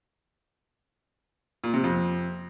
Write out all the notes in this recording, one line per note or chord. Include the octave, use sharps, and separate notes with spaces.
A#2
C3
F2